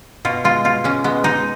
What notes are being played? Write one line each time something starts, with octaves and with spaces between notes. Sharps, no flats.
B2 F4
G#3 F4
B2 F4
G#3 C#4
G#3 B3
G#3 D#4